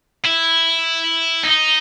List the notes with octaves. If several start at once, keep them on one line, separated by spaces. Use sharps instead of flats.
E4
D#4